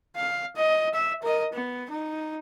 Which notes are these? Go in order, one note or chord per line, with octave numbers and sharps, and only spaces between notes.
F5
D#5
E5
A#4 D#5
B3
D#4